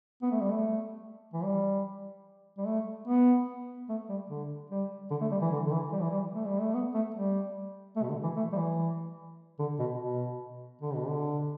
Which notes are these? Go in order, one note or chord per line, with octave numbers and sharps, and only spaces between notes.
B3
A3
G3
A3
E3
G3
G3
A3
B3
A3
G3
D3
G3
D3
A3
G3
E3
D3
D3
E3
G3
E3
G3
A3
G3
A3
B3
A3
G3
A3
B2
D3
E3
A3
G3
E3
D3
B2
B2
D3
B2
D3